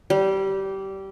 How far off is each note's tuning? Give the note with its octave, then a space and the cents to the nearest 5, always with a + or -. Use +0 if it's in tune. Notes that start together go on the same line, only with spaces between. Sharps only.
G3 -20